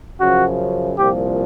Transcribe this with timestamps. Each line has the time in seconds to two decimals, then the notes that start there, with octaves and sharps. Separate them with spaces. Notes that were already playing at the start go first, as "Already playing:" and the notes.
0.21 F#2 C#3 F3 F#4
0.97 C2 A#2 F3 G4